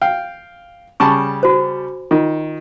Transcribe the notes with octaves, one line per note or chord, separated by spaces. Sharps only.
F5 G5
C#3 G3 A5 C#6
F#4 C5
D#3 F4